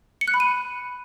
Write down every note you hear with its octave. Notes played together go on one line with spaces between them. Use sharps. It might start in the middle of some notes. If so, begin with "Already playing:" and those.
C#7
F#6
B5
D#7